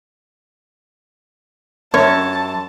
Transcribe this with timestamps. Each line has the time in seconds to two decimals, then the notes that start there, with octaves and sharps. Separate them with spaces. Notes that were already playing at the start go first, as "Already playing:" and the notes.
1.94 F#2 C#5 A5